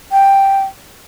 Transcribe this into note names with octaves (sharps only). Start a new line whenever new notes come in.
G5